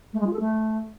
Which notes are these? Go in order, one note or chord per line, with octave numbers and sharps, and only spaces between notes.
A3
G#3
F4
A4
A3